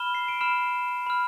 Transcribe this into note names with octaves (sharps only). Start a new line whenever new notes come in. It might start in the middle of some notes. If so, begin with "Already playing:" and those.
Already playing: B5 F6 E7 G7
C7
D7
B5 F6 C7 E7
B5 F6